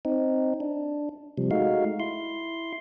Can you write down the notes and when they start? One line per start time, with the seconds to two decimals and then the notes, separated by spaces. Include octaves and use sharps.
0.05 C4 D#4
0.60 D4
1.37 C3 F3 G3
1.51 G#3 A3 D#4 F#4 F5
2.00 E4 C6